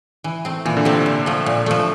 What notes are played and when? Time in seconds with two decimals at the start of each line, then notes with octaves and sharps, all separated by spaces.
0.24 E3
0.45 A3 C4
0.65 A#2 E3
0.77 D3
0.85 C3 A3 C4
1.06 A#2
1.26 F3 A3
1.46 A#2
1.66 F3 A3